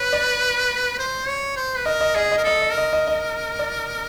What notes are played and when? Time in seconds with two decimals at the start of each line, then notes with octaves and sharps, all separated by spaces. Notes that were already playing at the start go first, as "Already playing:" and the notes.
Already playing: B4 C#5
0.13 D5
0.99 C5
1.28 C#5
1.57 C5
1.77 B4
1.86 A#4 D#5
2.01 D#5
2.15 G#4 D#5
2.31 D#5
2.38 A#4
2.44 A4 D#5
2.62 D#5
2.72 A#4
2.77 D#5
2.93 D#5
3.07 D#5
3.59 D5